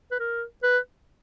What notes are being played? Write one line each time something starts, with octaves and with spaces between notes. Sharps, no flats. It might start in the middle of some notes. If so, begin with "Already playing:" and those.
B4
A#4
B4